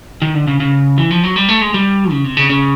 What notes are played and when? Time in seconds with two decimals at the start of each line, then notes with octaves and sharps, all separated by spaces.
0.22 D#3
0.34 D3
0.47 C#3
0.60 C#3
0.98 E3
1.11 F3
1.23 F#3
1.36 G3
1.49 A3
1.61 G#3
1.74 G3
2.11 C#3
2.24 C3
2.37 C#3
2.50 C#3